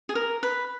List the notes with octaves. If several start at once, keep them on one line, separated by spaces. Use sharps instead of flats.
G#4
A#4
B4